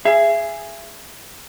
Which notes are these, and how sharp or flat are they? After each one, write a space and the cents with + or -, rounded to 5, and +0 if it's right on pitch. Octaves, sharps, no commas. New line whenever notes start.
G#4 +0 E5 +35